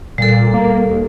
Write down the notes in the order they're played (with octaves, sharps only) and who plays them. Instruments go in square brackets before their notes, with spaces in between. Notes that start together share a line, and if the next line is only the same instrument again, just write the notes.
[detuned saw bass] A#2 [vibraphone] G3 A4
[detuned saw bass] A#3
D#2